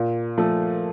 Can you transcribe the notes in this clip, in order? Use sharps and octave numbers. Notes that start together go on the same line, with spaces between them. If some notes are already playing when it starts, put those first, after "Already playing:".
Already playing: A#2
F3 A3